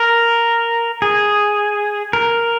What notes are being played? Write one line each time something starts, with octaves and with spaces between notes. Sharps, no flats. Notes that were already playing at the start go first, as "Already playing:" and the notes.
Already playing: A#4
G#4
A#4